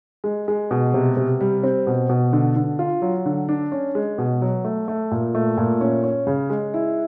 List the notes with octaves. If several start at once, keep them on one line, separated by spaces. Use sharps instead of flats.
G#3
G#3
B2
C3
C3
G3
C4
B2
B2
D3
D3
F4
F#3
D3
D4
C#4
G#3
B2
F#3
A3
A3
A#2
A3
A#2
C#4
C#4
C#3
G#3
E4